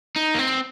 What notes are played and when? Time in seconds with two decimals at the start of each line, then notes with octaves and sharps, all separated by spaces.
0.16 D#4
0.34 A#3
0.39 C4